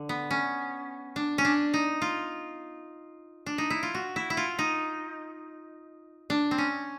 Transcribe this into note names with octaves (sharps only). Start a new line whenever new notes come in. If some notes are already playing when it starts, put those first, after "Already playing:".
Already playing: D3
B3
C#4
D4
C#4
D4
D#4
F4
D4
D#4
E4
F4
F#4
E4
E4
F4
D#4
D4
C4
C#4